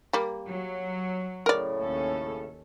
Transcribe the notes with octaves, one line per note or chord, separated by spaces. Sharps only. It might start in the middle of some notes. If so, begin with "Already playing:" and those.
G3 A#3
F#3
A2 C#3 A#4 D5
D#2 C#4 A4